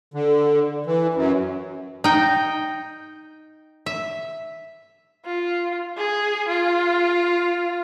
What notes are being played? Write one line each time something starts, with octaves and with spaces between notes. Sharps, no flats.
D3
E3
F#2
D#4 G5
E5
F4
G#4
F4